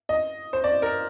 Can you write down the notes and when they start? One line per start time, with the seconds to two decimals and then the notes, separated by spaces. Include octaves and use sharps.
0.09 D#5
0.53 C5
0.64 D5
0.82 A#4